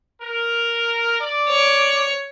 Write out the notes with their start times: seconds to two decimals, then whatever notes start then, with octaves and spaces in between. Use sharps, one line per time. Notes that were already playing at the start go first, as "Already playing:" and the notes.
0.22 A#4
1.19 D5
1.49 C#5